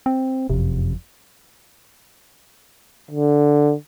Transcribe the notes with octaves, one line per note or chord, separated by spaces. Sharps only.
C4
F#1 F2 C3
D3